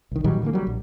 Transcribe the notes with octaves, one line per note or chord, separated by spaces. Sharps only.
C2 D#3
A#2 D#3 F#3 G3
D3 E3 G#3 A#3
F#3 G3
A#1